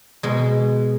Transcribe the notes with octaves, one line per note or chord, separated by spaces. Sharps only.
B2 G#3